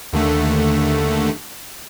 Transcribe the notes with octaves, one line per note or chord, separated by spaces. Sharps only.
D#2 D3 A3